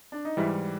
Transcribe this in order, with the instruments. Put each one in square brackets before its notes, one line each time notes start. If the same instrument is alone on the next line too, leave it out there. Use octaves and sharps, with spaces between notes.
[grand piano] D4
D#4
[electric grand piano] G#2 E3 G3 [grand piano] E4